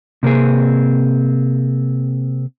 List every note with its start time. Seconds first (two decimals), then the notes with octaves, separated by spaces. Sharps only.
0.23 C3 A#3 C4 G#4